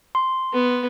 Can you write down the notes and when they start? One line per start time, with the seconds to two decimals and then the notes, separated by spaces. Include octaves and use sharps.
0.15 C6
0.53 B3